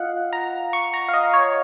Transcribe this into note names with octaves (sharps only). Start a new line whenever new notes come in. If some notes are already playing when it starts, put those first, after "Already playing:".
Already playing: F4 D#5 F5 F#5
A#5
C#6
A#5
F5
D#5
C#5